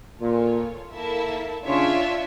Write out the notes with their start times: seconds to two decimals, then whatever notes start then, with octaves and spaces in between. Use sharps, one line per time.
0.21 A#2 F4 A4 C#5
0.94 A#3 E4 A4 E5 A5
1.65 C#3 D4 F4 C#5 E5